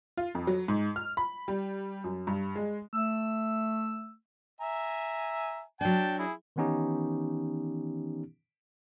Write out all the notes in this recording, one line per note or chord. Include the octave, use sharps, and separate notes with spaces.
F4
F2
F#3
G#2
F6
B5
G3
F#2
G2
G#3
A3 E6
E5 G#5 A#5
F#3 D4 G5 A5
E4 G#4
D#3 E3 B3 C#4 D#4 G4